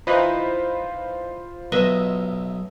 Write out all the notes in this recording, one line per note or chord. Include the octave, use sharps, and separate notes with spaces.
E3 D#4 F4 B4 C5 B5
B1 B4 D#5 E5